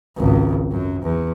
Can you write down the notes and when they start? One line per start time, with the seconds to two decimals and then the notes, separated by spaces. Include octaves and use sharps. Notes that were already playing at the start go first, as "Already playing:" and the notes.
0.17 G#1 C#2
0.71 F#2
1.02 E2